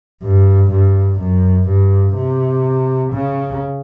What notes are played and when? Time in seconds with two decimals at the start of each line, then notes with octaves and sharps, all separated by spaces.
0.23 G2
0.71 G2
1.20 F#2
1.68 G2
2.16 C3
3.12 C#3